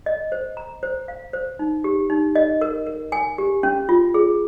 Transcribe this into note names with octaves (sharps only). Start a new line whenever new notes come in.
D#5
C5
A#5
C5
F5
C5
D#4
G4
D#4
D#5
A#4
A#4
G#5
G4
C#4
F4
G#4